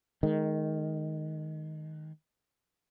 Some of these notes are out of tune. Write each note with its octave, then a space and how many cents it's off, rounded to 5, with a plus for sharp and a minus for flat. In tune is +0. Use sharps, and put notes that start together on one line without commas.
D#3 +0 G#3 +30